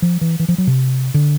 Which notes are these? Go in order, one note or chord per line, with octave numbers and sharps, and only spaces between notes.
F3
E3
E3
F3
F#3
C3
D3